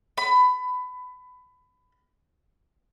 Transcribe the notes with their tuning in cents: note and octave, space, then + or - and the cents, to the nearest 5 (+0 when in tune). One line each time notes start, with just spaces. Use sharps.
B5 +20